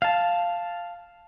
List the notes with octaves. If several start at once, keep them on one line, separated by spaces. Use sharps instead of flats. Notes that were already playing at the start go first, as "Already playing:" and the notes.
F5 A5